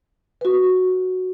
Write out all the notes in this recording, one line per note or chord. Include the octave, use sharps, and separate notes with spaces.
F#4 B4